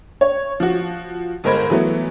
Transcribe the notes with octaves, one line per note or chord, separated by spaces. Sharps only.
C#5
F3 F#4
G1 G#3 A#4 C5 B5 G#6
E3 F#3 A3 B3